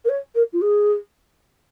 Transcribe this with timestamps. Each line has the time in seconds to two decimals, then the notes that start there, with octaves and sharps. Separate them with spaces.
0.04 A#4
0.09 C#5
0.35 A#4
0.53 F4
0.61 G#4